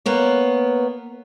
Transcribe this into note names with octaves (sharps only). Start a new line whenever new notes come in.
A#3 B3 C#5